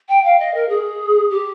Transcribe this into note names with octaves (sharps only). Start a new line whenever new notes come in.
G5
F5
D#5
A#4
G#4
G4